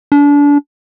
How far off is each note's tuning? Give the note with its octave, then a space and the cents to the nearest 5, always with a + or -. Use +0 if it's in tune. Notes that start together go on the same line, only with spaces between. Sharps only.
D4 -30